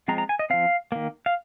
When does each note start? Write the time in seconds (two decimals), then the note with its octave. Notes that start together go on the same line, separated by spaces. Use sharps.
0.08 F3 G#3 C4 A#5
0.18 A#5
0.29 G#5
0.39 D#5
0.50 F3 C4 F5
0.92 D#3 A#3
1.26 F5